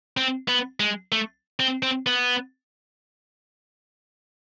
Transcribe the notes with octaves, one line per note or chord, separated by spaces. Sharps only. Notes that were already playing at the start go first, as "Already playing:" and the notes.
C4
B3
G#3
A3
C4
C4
B3